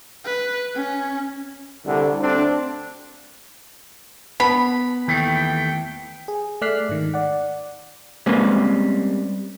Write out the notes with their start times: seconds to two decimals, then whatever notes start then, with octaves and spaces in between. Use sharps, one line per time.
0.25 B4
0.75 C#4
1.85 C2 D3
2.20 D2 D3 C4 D4
4.40 B3 B5
5.08 D#2 E3 A3 G5
6.28 G#4
6.61 A3 D5 F6 F#6 B6 C7
6.89 G#2 D#3
7.14 D5 F#5
8.26 G3 G#3 A#3 C4 C#4 B4